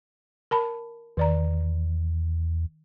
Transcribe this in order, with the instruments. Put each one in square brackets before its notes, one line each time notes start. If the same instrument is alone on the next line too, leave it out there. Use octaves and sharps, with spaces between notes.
[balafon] A#4 A5 B5
[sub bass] E2 [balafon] D#3 D5 A#5